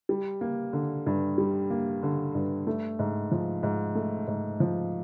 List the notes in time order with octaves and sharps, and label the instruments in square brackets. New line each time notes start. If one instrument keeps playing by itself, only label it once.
[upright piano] G3
A#3
D3
G2
G3
A#3
D3
G2
A3
G#2
F3
G#2
A3
G#2
F3